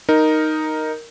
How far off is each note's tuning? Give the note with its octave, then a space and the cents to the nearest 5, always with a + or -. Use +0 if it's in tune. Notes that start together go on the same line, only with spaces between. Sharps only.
D#4 +0 A#4 +0